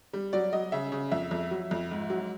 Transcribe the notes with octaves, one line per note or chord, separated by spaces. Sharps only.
G3
F#3 D5
F#3 D#5
C#3 E5
C#3
F2 E5
F2
F#3
F2
G#2
F#3